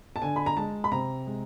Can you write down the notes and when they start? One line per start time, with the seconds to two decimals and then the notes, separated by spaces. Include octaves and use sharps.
0.16 A5
0.22 D3 G#5
0.36 B5
0.46 A#5
0.57 G#3 A5
0.84 B5
0.92 C3 A#5
1.27 G#3